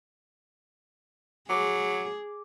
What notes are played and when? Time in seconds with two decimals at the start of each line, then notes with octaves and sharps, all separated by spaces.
1.50 F#3 G#4 D6